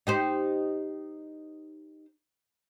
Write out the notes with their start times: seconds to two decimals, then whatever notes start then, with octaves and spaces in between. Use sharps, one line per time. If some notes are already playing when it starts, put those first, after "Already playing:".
0.07 D#4 G4 C5